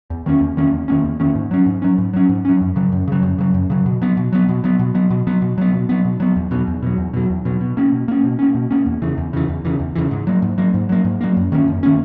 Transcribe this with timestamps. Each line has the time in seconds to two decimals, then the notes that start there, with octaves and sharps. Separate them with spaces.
0.10 E2
0.26 D#3 A#3 C#4
0.41 E2
0.57 D#3 A#3 C#4
0.73 E2
0.88 D#3 A#3 C#4
1.04 E2
1.20 D#3 A#3 C#4
1.35 G#2
1.51 F#3 C#4
1.66 G#2
1.82 F#3 C#4
1.98 G#2
2.13 F#3 C#4
2.29 G#2
2.45 F#3 C#4
2.61 F#2
2.76 C#3 F#3
2.92 F#2
3.08 C#3 F#3
3.23 F#2
3.38 C#3 F#3
3.54 F#2
3.70 C#3 F#3
3.86 B2
4.02 F#3 B3
4.17 B2
4.33 F#3 B3
4.49 B2
4.64 F#3 B3
4.79 B2
4.95 F#3 B3
5.10 B2
5.27 F#3 B3
5.42 B2
5.58 F#3 B3
5.73 B2
5.89 F#3 B3
6.05 B2
6.20 F#3 B3
6.36 E2
6.51 B2 F#3
6.67 E2
6.83 B2 F#3
6.98 E2
7.14 B2 F#3
7.30 E2
7.45 B2 F#3
7.61 B2
7.77 A#3 C#4
7.92 B2
8.08 A#3 C#4
8.24 B2
8.39 A#3 C#4
8.55 B2
8.71 A#3 C#4
8.86 E2
9.02 C#3 E3
9.17 E2
9.33 C#3 E3
9.48 E2
9.65 C#3 E3
9.80 E2
9.96 C#3 E3
10.11 G#2
10.27 F#3 A#3
10.42 G#2
10.58 F#3 A#3
10.74 G#2
10.89 F#3 A#3
11.05 G#2
11.21 F#3 A#3
11.37 F#2
11.52 D#3 A#3 C#4
11.68 F#2
11.83 D#3 A#3 C#4